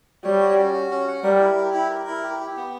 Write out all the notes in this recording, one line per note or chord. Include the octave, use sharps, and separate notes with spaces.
G3 C#5
F#4
C#4
F#4
C#4
F#5
G3 A#4
E4
G4
E4
A#4
E4
G4
G4
B3